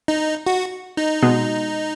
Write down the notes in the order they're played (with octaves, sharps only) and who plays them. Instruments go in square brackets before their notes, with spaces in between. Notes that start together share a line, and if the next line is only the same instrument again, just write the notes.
[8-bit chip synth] D#4
F#4
D#4
[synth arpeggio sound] B2 G#3 B3